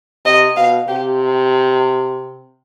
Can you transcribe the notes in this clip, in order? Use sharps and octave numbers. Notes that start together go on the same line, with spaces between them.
C3 D#5
B2 F5
C3 G4